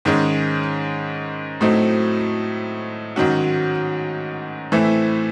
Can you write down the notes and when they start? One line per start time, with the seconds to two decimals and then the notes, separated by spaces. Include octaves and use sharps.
0.05 G#2 D#3 G#3 C#4
1.61 A2 F#3 A3 C4 D#4
3.16 G#2 D#3 F#3 C#4 F#4
4.72 A2 E3 A3 C4 E4